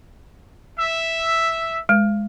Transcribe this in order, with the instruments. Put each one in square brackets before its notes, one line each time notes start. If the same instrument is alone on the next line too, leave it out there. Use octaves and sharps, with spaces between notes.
[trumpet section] E5
[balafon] G#3